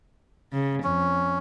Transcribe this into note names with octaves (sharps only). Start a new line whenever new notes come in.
C#3
F2 C#4